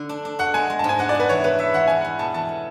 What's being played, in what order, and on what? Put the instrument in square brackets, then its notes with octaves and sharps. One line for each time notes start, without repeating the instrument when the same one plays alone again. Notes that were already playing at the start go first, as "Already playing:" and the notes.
Already playing: [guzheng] D3
D4
D4
[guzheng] F#4 [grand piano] F#5
[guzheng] G#3 [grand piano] G#5
[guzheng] G#3
[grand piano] A5
[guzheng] G#2
[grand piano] G#5
[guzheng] D4 [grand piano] F#5
[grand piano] D5
[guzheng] G#4 [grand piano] B4
[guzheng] E3 [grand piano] C#5
[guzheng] E3 [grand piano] B4
[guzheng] B3 [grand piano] E5
[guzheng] E3 [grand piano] F#5
[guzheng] E2 [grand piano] G#5
[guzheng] E2 [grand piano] F#5
[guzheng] B2 [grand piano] A5
[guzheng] E2 [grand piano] A5
[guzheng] A4